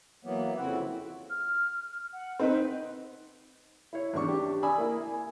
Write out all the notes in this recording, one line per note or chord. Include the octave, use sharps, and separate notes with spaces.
E3 F#3 A#3 B3
F2 C#3 C4 E4 F#4 F#5
F6
F#5
C4 D#4 B4
E4 C#5
E2 D4 C#6
D4 G4
D5 G#5 B5 D#6 E6
A#3 E4
G#5